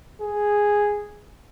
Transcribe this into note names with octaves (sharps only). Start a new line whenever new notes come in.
G#4